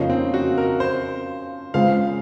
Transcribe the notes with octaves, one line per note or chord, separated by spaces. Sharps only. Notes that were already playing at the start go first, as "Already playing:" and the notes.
Already playing: F2 C#3 F3 A#3 C#4 D#4
C4
F#4
A#4
C5
C#3 G#3 C4 F4 G#4 F5